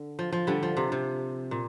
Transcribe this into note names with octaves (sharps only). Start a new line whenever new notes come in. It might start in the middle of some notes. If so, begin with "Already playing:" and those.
Already playing: D3
F3
F3
D3 G3
F3
C3
C3
A#2